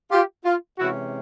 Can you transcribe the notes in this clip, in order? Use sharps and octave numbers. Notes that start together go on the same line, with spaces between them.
F4 G4
F4
C3 E3 G#3 C#4 E4 F#4